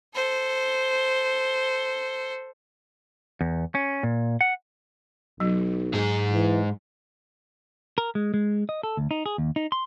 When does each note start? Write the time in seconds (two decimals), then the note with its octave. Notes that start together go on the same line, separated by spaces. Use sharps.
0.15 A4 C5
3.41 E2
3.75 C#4
4.03 A#2
4.41 F#5
5.40 B1 F#3
5.94 G#2 G#4
6.33 E3
7.98 A#4
8.15 G#3
8.34 G#3
8.69 D#5
8.83 A4
8.97 D2
9.11 D#4
9.26 G#4
9.38 D#2
9.56 D#4
9.72 C6